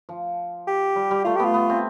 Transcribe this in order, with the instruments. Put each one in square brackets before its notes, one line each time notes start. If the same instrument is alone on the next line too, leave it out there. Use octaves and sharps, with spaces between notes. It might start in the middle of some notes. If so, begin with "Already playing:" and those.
[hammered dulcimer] F3
[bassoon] G4
[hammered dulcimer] G3
G3
[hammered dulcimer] A3 [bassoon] F4
[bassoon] G4
[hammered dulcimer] B3 [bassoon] F4
[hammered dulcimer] B3
C4